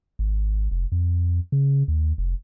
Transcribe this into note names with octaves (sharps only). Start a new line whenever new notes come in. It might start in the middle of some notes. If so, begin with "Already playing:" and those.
G#1
F1
F2
C#3
D#2
F1